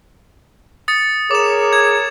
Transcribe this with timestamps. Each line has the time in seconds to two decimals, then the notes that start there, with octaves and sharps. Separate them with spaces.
0.88 D#6 A6 C#7
1.31 G#4 A#4 C#5 D6 E7
1.73 G#6